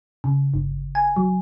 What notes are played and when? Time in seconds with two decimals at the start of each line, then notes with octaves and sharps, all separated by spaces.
0.24 C#3
0.54 G1
0.95 G#5
1.16 F#3